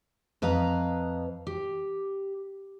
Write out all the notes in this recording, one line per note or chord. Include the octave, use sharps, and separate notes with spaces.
F2 B4 D#5 F5 A#5
G4